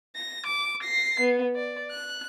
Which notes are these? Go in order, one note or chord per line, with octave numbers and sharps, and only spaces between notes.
A#6
D6
A#6 C7
B3
D5
F#6